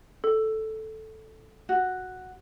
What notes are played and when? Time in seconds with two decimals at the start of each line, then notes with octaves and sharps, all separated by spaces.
0.24 A4
1.69 F#4